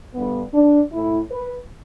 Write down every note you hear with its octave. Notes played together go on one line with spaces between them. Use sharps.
G2 D3 G3 B3
D4
A2 A3 E4
B4